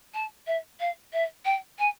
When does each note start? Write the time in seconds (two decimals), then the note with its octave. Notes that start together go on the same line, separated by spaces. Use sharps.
0.14 A5
0.47 E5
0.80 F5
1.13 E5
1.45 G5
1.78 G#5